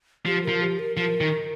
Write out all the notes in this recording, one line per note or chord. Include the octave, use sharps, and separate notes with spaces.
F3 G4
F3 A#4
G4
A#4
F3 A#4
D#3